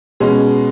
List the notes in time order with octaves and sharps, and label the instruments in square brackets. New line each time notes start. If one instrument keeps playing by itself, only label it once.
[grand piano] B2 G#3 C#4